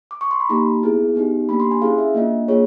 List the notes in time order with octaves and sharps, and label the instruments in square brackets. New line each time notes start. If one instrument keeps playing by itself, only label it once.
[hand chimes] D6
C#6
C6
B5
A#3 D#4 G4 A#5
B3 E4 G#4
B3 D#4 G4
A#3 D4 G4 B5
C6
G#5
C#4 E4 G#4 F5
E5
A#3 D4 F4 D#5
A#3 D4 F4 G#4 C#5